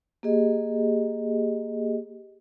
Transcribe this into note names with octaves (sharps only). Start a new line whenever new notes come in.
A#3 G4 G#4 D#5